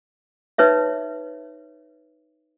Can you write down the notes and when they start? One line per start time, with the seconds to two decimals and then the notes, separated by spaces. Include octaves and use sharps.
0.58 D#4 B4 C#5 E5